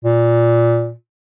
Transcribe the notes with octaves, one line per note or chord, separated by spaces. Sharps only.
A#2